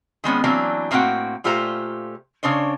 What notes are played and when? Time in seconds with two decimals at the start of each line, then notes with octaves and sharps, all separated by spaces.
0.24 D#3 G#3 B3 C#4
0.44 E3 F#3 A#3 C4 D4
0.91 A2 A#3 C4 F#4 F#5 G5
1.44 A#2 A3 F4 G4 C5 A#5
2.43 C#3 D4 C5 C#5